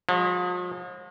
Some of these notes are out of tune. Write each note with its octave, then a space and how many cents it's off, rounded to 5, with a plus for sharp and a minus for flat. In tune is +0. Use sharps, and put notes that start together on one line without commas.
F3 +45 G#3 -25